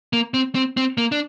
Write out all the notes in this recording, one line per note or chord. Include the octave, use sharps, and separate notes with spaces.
A#3
C4
C4
C4
A#3
D4